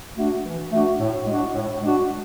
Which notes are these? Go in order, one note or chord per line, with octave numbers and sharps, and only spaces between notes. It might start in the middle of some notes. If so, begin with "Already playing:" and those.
A3 D4 F#4
E3
A3 D4 F#4
A2
G#3 D4 F#4
A2
G#3 D4 F#4